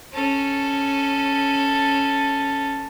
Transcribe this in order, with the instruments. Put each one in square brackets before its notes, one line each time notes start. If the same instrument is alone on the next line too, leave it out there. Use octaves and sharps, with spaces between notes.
[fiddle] C#4 A4